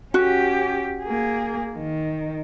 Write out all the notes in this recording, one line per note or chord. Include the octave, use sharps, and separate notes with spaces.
C#4 F#4 G4
A#3 G#4
D#3